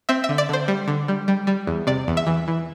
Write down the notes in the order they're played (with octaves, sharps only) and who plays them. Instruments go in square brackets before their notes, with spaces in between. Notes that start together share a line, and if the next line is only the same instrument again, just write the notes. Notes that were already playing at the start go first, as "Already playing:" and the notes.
[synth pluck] C4 E5
E5
D3
D5
D3 C5
G3
D3
G3
G3
G3
E2
C3 D5
E2
E5
E3
E3